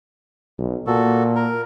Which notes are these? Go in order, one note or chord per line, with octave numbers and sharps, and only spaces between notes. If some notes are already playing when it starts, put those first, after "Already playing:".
B1
A#2 F#4 A4
A#4